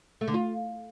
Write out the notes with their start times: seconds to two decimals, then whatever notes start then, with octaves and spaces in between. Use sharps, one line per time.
0.21 A3
0.28 D3
0.34 F4